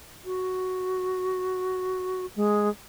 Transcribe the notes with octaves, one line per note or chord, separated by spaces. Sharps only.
F#4
G#3